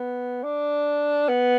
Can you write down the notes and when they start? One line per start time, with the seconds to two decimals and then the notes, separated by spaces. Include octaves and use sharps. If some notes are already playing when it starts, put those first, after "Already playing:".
Already playing: B3
0.43 D4
1.29 B3